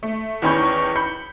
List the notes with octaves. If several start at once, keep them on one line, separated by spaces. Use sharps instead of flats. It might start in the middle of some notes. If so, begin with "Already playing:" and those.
A3
E2 D#3 C#4 B5 C#6 G6
B5 G6 C#7